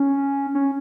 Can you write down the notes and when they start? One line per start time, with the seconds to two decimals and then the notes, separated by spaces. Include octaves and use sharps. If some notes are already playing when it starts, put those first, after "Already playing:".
Already playing: C#4
0.55 C#4